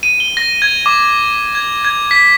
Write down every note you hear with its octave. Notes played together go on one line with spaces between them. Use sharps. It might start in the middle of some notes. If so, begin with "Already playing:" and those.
D#7
G7
A#6
G#6
D6
G#6
G#6
B6